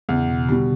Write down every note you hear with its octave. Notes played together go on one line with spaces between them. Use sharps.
E2 C#3
B2
B2 D3 G3